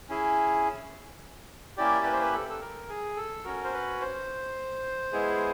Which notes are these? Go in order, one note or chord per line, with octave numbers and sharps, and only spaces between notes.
C#4 E4 G#4
A#3 C#4 E4 G4 D5
B4
C5
B4
A4
A4
A#4
G#4
A4
C#4 F#4 A#4
C5
B4
C5
G#3 B3 E4 G#4